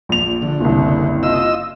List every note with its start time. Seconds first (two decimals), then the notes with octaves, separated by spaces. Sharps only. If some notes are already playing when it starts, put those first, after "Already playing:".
0.09 A#1 F7
0.42 D3
0.60 F#1 C2
1.23 F4 D#5 E6